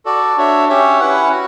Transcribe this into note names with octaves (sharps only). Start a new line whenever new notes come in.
F#4 A4 D5
D4 F#4 C#5 E5
C#4 G4 C#5 E5
C#4 E4 B4 F#5
F#4